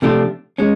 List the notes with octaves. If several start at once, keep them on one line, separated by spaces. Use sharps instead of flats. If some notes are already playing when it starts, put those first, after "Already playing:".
C3 F3 A3 D4 F4
G#3 C#4